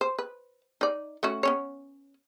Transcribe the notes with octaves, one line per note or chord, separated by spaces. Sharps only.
C5
B4
D#4 D5
A3 C#4 F#4
B3 C#4 C#5